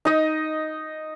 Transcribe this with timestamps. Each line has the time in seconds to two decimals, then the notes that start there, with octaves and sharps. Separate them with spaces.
0.05 D#4 D#5